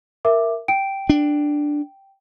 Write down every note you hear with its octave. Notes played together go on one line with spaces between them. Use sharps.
A#4 E5 D6
G5 D7
D4